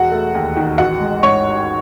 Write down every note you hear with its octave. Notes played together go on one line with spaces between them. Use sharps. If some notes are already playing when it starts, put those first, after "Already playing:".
Already playing: E1 F#4 F#5
A3
D#2
D#3
A1 F#4 F#5
G#3
G#2 C#5 C#6